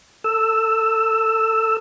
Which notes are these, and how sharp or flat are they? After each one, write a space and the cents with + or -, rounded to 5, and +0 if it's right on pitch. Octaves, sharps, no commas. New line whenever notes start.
A4 +20 E6 +0